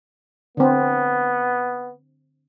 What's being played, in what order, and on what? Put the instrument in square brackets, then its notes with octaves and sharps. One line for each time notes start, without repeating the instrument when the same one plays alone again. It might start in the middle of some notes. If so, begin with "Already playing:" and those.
[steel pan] D3 C4 [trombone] B3